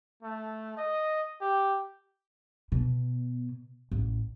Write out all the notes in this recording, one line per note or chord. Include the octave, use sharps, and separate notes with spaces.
A3
D#5
G4
B2
A1